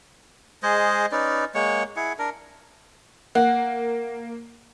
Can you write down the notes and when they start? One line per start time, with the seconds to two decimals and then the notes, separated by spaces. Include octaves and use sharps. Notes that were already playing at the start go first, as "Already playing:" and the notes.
0.63 G#3 G#4 C5 D#5
1.12 C#4 D#4 B4 D5
1.55 G#3 A#3 C#5 F#5
1.96 E4 G#4 F#5
2.19 D4 A#4
3.35 A#3 F#5